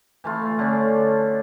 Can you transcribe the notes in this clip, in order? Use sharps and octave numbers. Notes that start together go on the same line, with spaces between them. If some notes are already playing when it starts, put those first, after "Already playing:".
E3 A3 F4
D3 C#4 D4